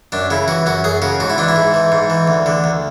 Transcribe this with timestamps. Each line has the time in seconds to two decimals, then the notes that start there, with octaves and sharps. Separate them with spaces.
0.12 F#2 D4
0.30 C#3 E4
0.48 E3 F#4
0.66 F#2 F#4
0.84 F#2 G#4
1.02 C#3 F#4
1.20 G#2 F#4
1.30 E4
1.38 E3 D4
1.48 E4
1.56 G#2
1.74 E3
1.92 G#2
2.10 E3
2.27 D2
2.46 D3
2.64 D2